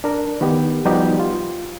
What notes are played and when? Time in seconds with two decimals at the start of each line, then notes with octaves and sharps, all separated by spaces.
0.04 D4 A#4
0.41 D#3 B3 G4
0.85 F3 G3 B3 D#4 F#4 G4
1.19 F4